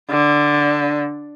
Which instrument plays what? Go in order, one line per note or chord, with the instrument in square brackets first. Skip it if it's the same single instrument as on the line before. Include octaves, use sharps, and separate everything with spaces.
[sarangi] D3